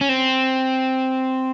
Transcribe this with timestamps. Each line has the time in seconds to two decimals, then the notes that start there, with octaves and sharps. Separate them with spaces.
0.01 C#4
0.09 C4